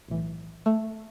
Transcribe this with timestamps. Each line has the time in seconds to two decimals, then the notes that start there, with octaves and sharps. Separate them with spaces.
0.08 B1 A2 E3
0.66 A3